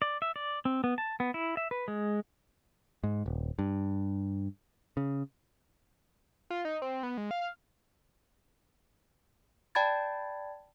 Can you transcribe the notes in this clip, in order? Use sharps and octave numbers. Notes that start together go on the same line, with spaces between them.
D5
E5
D5
C4
B3
A5
B3
E4
E5
B4
G#3
G#2
D#1
G2
C#3
F4
D#4
C4
B3
G#3
F5
D5 G5 A5 B5 G#6 A6